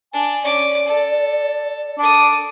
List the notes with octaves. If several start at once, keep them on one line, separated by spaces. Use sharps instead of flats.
D4 G#5
C#4 D5 D6
A4
D4 A4 D#6